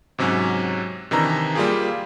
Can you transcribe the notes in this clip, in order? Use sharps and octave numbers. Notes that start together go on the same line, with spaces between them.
G#2 C3 F#3 C#4
C3 D#3 E3 D4 A#5
G3 A#3 F4 G4 G#4